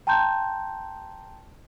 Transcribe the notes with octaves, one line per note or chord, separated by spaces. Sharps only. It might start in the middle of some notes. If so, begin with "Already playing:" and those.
G5 A5 A#5 C6 G6